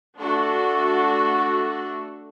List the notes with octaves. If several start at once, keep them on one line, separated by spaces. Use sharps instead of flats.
A3 D4 F#4 A4